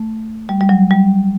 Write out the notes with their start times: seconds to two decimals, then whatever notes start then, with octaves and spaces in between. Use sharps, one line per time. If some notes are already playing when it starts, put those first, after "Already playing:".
Already playing: A3
0.49 G3
0.61 G3
0.69 F#3
0.91 G3